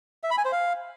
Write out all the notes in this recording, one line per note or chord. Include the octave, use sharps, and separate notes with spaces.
E5
B5
G#5
C5
F5